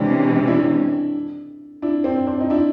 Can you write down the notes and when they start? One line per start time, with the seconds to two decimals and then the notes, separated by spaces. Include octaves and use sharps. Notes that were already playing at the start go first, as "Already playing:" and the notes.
Already playing: C3 E3 G#3 C#4 D4 E4
0.47 D4 E4
1.82 D4 E4
2.04 C4 D4
2.27 C4 D4
2.40 D#4
2.50 D4 E4